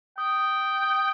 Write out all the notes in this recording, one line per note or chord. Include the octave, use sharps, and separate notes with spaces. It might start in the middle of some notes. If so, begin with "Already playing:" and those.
G5 D#6
D#6
D#6
D#6